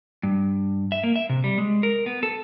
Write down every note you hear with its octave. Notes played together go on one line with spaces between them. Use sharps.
G2
E5
A#3
E5
C3
G3
G#3
A#4
B3
A4